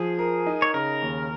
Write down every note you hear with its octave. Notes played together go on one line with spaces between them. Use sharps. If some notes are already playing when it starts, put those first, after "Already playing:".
Already playing: F3 G#4
A#4
D#4
C#5
C#3 A#4
D#2